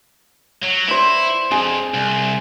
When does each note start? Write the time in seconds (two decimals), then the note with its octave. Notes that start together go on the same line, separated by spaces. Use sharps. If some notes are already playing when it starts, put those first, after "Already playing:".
0.63 F#3
0.88 E4 C5 D5
1.52 F2 G#4
1.94 C2